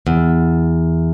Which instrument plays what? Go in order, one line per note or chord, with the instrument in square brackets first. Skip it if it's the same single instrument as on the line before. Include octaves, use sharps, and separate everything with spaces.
[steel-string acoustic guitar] E2